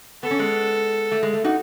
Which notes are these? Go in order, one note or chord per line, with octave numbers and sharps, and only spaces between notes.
B3 A4
C#4
G#3 B3
A3
G#3
A3
D#4 F#4